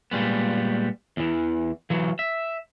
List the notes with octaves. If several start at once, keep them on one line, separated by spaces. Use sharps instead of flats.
A#2 G3 G#3 B3
E2 E3
E3 F#3
E5